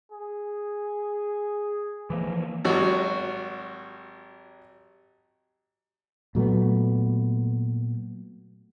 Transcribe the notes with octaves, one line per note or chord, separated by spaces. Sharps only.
G#4
E3 F3 A#3
G#1 F#3 G3 F#4
A#2 F#3 A3 B3